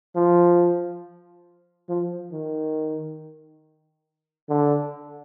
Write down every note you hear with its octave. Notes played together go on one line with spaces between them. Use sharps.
F3
F3
D#3
D3